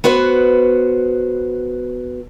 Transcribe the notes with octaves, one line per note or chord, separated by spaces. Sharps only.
B3 F#4 B4 C5